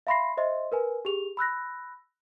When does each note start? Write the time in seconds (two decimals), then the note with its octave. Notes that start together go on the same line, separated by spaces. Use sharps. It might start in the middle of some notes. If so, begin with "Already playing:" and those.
0.07 E5 F5 B5 C6 A#6 C7
0.37 C5 D#5 E5 C6
0.72 A#4 B4 G#5
1.05 G4 G#4 F7
1.37 B5 E6 F#6 A#6